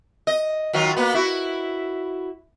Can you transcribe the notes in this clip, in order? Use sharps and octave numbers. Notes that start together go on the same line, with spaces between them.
D#5
D#3 F#3 F4
A#3 B3
E4 F#4